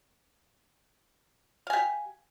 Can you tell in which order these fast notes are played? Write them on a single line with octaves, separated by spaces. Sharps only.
F5 G#5 G4